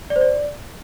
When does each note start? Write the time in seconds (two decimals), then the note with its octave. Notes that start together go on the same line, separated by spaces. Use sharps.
0.10 D5
0.16 C5
0.21 D5